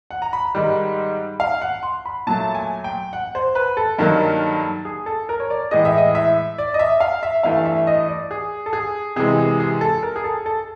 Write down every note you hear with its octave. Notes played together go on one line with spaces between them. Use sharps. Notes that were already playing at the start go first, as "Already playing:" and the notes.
F#5
A#5
B5
G#2 D#3 G3
F5
F#5
C6
B5
A#2 F#3 A3 A5
G#5
G5
F#5
C5
B4
A4
G2 D#3 F#3 A#3
G#4
A4
A#4
C#5
D5
A2 E3 G#3 D#5
E5
D#5
E5
D5
D#5
E5
F5
E5
G2 E3 A3 F5
E5
D#5
D5
G#4
A4
G#4
C3 E3 G#3 G#4
G#4
G#4
A4
A#4
G#4
A4
A4